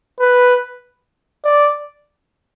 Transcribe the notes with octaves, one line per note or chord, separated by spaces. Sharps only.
B4
D5